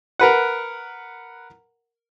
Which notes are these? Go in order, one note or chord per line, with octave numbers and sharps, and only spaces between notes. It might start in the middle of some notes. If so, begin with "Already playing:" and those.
A#4 B4 F#5